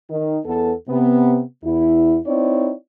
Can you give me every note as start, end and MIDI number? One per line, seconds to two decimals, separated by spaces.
0.10 0.39 51
0.46 0.72 40
0.46 0.72 59
0.46 0.72 69
0.89 1.41 48
0.89 1.41 59
1.64 2.18 40
1.64 2.18 64
2.26 2.72 60
2.26 2.72 63
2.26 2.72 64
2.26 2.72 73
2.26 2.72 74